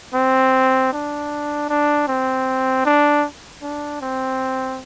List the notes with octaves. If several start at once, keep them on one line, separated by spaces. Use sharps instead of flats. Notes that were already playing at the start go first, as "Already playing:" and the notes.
C4
D4
D4
C4
D4
D4
C4